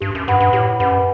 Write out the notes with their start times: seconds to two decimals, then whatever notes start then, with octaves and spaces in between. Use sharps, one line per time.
0.01 G2 G4
0.15 F#2
0.28 G2 B4 F#5 B5
0.40 G2
0.53 A2 G4
0.80 F#2 B4 F#5 B5